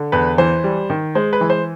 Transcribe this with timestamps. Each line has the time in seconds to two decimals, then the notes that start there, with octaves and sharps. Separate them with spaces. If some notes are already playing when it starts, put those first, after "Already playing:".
Already playing: D3
0.12 E2 B4
0.38 E3 C5
0.64 G3
0.90 D#3
1.15 G#3 C5
1.33 B4
1.41 E3
1.50 C5